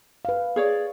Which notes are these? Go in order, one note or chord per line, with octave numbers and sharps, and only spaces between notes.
B4 F5
G#4 C#5 D5